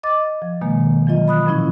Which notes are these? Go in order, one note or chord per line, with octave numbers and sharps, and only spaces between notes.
D#5 D6 A6
F3
B2 D#3 G#3 A#3
E3 F#3 F4 D#5
B5 D#6 F#6
A#2 F3 C#4 E4 F4